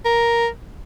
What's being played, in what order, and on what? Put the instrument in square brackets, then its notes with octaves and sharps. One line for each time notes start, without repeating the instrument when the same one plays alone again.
[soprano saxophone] A#4